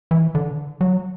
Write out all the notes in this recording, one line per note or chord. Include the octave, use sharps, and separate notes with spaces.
E3
D3
F#3